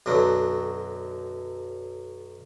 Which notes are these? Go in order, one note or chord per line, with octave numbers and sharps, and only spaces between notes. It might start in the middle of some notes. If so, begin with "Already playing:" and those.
B1 F#2 D3 F#3